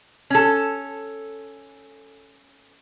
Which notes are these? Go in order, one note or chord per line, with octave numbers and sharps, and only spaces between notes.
C#4 A4